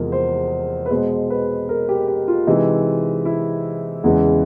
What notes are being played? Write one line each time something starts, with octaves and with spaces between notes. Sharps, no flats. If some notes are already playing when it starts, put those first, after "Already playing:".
Already playing: E2 C3 F3 G#3 G4 G#4 A#4
C5
B4
B2 G#3 C5
B4
A#4
G4
G4
F4
C3 E3 G#3 D#4
E4
E2 C#3 E3 G#3